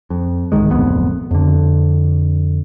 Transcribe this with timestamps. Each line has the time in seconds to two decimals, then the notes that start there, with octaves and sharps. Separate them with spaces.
0.10 F2
0.52 C2 G#2 D#3 G#3
0.69 D1 B1 F2 B3
1.31 F2 D3